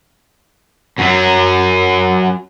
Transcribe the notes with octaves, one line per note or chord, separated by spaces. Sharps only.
F#2 F#3